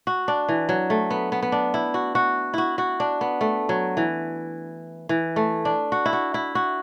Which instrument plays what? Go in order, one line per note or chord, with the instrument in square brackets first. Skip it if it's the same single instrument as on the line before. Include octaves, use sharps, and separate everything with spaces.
[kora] F#4
D4
E3
F#3
A3
B3
B3
B3
D4
E4
F#4
F#4
E4 F#4
F#4
D4
B3
A3
F#3
E3
E3
A3
D4
F#4
E4
F#4
E4
F#4